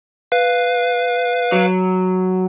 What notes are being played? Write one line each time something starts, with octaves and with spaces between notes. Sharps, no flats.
B4 F5
F#3